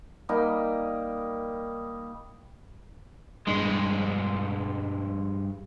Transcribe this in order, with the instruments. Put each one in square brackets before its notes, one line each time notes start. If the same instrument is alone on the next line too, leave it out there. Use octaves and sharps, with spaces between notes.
[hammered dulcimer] G3 A#3 D#4
[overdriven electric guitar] G2 G#3